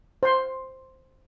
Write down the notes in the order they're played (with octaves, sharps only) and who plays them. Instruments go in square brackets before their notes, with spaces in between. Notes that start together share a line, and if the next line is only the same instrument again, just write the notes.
[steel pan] C5 C6